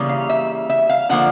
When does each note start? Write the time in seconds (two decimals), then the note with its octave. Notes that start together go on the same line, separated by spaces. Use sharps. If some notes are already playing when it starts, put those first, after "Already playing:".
Already playing: C#3 E3 G3 A#3
0.09 F5
0.30 E5
0.70 E5
0.89 F5
1.09 D3 F3 A#3 F#5